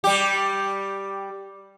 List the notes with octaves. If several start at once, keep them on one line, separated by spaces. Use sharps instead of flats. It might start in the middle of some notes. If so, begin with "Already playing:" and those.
G3 G4